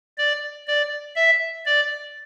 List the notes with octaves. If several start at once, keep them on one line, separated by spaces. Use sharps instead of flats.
D5
D5
E5
D5